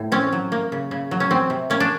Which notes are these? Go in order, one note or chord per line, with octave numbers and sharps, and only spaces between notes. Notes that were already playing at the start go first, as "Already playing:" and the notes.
Already playing: A2
C4 C#4
F#3
A#3
C#3
C#3
F#3
C#4
F#3 C4
C3
A#3 C#4
D4